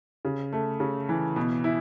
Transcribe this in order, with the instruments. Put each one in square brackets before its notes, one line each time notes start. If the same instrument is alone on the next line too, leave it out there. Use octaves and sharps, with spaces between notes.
[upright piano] C#3
A3
C#3
E3
B2
E4